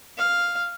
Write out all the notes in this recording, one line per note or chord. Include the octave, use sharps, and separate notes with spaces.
F5